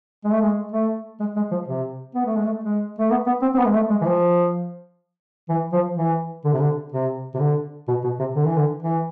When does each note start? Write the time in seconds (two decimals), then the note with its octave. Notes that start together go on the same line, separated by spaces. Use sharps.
0.24 G#3
0.32 A3
0.41 G#3
0.72 A3
1.20 G#3
1.36 G#3
1.51 F3
1.67 C3
2.15 B3
2.26 A3
2.36 G#3
2.45 A3
2.63 G#3
2.99 A3
3.11 B3
3.26 B3
3.42 C4
3.54 C4
3.59 B3
3.66 G#3
3.74 A3
3.90 G#3
4.01 E3
4.05 F3
5.49 E3
5.73 F3
5.97 E3
6.44 D3
6.52 C3
6.59 D3
6.92 C3
7.34 C3
7.39 D3
7.88 B2
8.04 B2
8.19 C3
8.35 D3
8.46 E3
8.57 D3
8.82 E3